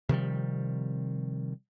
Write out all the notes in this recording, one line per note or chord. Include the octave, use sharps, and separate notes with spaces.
C3 D#3 F3 G3